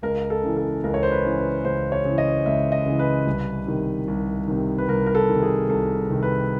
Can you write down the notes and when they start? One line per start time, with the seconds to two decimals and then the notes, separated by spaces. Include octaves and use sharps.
0.02 C#2 A#4
0.30 A4
0.43 C#3 E3
0.57 A4
0.83 C#2 A#4
0.94 C#5
1.03 C5
1.11 B4
1.25 C#3 E3
1.38 B4
1.64 C#2 C5
1.92 C#5
2.05 C#3 E3
2.18 D#5
2.46 C#2 E5
2.72 D#5
2.86 C#3 E3
2.99 B4
3.27 C2
3.66 C3 D#3
4.08 C2
4.48 C3 D#3
4.78 B4
4.88 C2 A#4
5.06 A#4
5.15 A4
5.29 C3 D#3
5.42 G#4
5.69 C2 A4
6.10 C3 D#3
6.23 B4